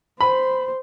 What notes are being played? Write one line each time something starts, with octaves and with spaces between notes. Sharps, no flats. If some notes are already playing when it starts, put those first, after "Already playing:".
C5 B5